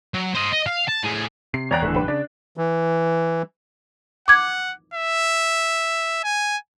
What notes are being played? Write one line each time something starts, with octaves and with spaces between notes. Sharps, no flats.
F#3
C5 D#5
D#5
F5
A5
A2 G#4
C3 C7
E2 C#5 D5 G5 A#5 F#6
D1 D3 E3 A3 A4
A#1 G2 B4 G5
C#3 D4 D5
E3
F#5 D6 G#6
E5
G#5